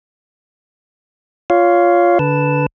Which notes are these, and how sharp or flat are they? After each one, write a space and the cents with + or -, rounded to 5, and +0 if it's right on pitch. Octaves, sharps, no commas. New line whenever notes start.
F4 +0 C#5 +20 F5 +0
D3 -20 B4 +0 A5 +0